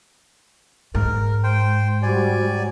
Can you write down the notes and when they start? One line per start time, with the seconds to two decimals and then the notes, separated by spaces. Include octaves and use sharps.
0.95 G#2 A#4
1.44 C5 G5
2.03 G3 F#4 C5 D5 G#5
2.38 F#3 G3